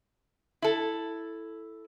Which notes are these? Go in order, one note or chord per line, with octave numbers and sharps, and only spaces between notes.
E4 A4